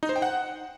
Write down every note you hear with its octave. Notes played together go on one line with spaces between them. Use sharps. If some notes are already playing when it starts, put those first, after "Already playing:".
D#4
C5
G5
F#5